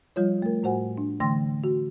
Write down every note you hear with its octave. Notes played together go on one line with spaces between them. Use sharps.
F3 G3 F4 C#5
A3 A#4
A2 F#4 C5 F#5 G#5
D4
D3 E3 A3 G5 C6 A#6
F#4